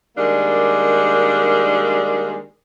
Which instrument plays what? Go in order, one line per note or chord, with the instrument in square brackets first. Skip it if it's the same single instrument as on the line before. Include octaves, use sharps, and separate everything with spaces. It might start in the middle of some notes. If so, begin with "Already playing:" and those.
[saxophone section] D#3 G3 G#3 A#3 D4